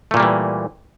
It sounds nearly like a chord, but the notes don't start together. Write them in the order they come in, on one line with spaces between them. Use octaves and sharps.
A3 A#2 A#3 G3 E3